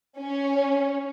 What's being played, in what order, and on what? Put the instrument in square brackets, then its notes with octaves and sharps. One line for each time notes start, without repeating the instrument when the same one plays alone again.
[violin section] C#4